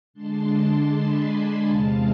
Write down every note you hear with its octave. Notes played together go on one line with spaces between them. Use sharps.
D3 G#3 D4 A5 C6
G#5 B5
E2 C3 G#3 C4 F5 A5